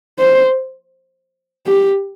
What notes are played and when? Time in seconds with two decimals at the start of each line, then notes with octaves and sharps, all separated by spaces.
0.19 C5
1.67 G4